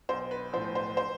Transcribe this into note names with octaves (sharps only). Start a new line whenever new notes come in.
B1 C5
B4
A2 F3 C5
C5
C5